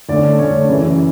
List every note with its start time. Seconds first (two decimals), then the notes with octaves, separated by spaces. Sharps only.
0.09 D2 D3 A3 C#4 D5
0.39 D2 D3 A3 C#4 C#5
0.68 F#2 C#3 E3